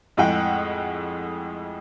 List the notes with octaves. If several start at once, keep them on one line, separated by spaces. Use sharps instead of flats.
F2 A2 G#3 G#4 F#5 G5